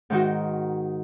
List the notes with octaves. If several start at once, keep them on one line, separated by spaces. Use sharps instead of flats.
G#2 D#3 D#4 F#4